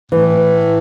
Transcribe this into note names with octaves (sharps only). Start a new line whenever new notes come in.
A2 E3